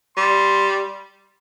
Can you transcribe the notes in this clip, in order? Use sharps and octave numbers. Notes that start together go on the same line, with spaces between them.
G3 C6